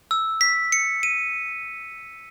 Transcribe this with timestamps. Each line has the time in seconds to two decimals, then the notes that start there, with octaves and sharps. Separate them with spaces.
0.11 E6
0.41 B6
0.72 C#7
1.03 D#7